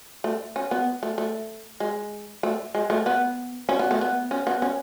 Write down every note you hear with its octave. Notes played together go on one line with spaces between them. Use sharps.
A3
C#4
B3
A3
A3
G#3
A3
G#3
A3
B3
C#4
B3
A3
B3
C#4
B3
C#4